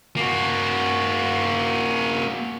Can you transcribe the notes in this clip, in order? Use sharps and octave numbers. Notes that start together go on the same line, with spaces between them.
A#3 F#4